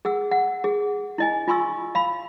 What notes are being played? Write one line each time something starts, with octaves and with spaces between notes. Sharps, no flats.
G#4 F#5 E6
F#5
G#4
E4 D#5 G#5
F4 G#5 C6 C#6 E6
F5 B5